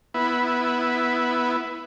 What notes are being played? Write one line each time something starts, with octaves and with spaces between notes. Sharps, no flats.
B3 E4